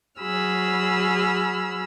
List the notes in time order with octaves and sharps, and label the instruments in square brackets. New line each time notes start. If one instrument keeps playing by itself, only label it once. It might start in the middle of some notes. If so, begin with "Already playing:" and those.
[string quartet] F#3 F#4 G#4 B5 E6 F6